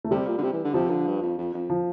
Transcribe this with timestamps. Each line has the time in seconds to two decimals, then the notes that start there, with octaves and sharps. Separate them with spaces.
0.04 A3
0.11 C3 G3
0.27 A#2
0.38 D3
0.43 C3
0.53 E3
0.64 D3
0.74 C3 F3
0.90 D3
1.07 G2
1.22 F2
1.38 F2
1.54 F2
1.70 F3